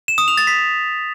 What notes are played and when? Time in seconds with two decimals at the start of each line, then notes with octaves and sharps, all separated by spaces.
0.08 E7
0.18 D#6
0.28 F7
0.38 A6
0.47 B6